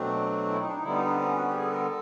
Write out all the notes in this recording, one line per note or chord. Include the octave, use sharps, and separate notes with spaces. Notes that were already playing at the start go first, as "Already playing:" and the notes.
Already playing: B2 F#3 A3 C4 D4
E4
D#4
D4
D#4
D3 G3 B3 E4
D#4
D4
C4
C#4
F#4
G4
G#4
A4
A#4
A4